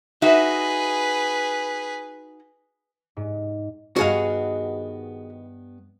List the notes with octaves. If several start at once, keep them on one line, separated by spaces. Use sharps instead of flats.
D#4 F#4 G#4 B4 E5
G#2
G2 D#3 B3 F#4 G#4 B4 D#5 F5